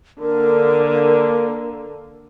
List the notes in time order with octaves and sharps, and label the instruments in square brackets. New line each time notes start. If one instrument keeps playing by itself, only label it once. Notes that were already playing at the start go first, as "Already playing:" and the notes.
[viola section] D3 A#3 [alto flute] A#4